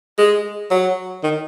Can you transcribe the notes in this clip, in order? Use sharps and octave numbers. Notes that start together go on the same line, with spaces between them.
G#3
F#3
D#3